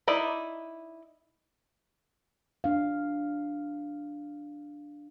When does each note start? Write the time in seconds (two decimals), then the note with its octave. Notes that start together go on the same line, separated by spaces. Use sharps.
0.08 D#4 E4 D5
2.64 D4 F5